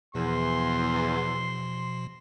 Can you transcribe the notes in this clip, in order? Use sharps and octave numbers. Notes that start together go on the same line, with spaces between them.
E2 B2 F3 C6